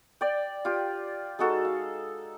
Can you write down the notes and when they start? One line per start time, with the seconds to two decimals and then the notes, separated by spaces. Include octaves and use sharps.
0.21 D5 G5
0.65 F4 G4
1.39 G#3 D#4 F#4 A4
1.65 F5